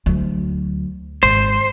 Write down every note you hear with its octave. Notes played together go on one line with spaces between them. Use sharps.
D2 F#3
G#1 C5